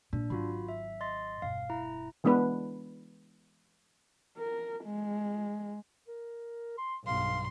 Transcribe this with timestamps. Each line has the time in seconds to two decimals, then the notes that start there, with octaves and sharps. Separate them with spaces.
0.13 A#2 D4
0.30 G#1 F#3 F4 F#4 B5
0.69 E5
1.01 D#5 C6 A6
1.42 E1 G2 F5
1.70 E4 A#5
2.24 E3 G#3 B3 D4 B4
4.37 A#4
4.85 G#3
6.08 A#4
6.78 C6
7.07 B1 G2 F5 C6